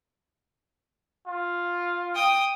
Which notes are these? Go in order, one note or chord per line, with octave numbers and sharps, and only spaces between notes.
F4
G5 D#6